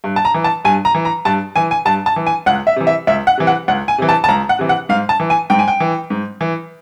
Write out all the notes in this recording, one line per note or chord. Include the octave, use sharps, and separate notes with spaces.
G2
A5
A#5
E3
A5
G2 G#5
A#5
E3
A#5
G2 A5
E3 G#5
G#5
G2 A5
A5
E3
G#5
C#2 F#5
E5
C3 E3
E5
C#2 E5
F#5
C3 E3
F#5
C#2 F#5
G#5
C3 E3
A5
A5
C#2 A#5
F#5
C3 E3
F#5
G#2 F5
A5
E3
G#5
G#2 G5
G#5
G5
E3
G#2
E3